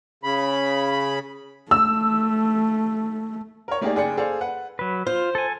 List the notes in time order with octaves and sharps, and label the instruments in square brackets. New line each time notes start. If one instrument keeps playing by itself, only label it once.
[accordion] C#3 B5
[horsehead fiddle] A3 [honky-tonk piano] E6
[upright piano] A#4 C#5
A3 A#3 D#4 G4 G#4 D5
F#1 G#4 D5 G5 C#7
G#4 A4 C5 D5 F5
B4 F#5
[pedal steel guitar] F#3 B4
[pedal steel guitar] F4 [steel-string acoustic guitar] C5
[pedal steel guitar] A4 G#5